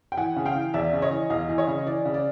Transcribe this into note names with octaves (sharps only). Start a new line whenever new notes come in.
G5
E3 F#5 G#5
C#3
F5 G5
E3
E2 D5 E5
C#3
C#5 D#5
E3
E2 D#5 F5
E3
C#5 D#5
C#3
E3 D5
C#3
D5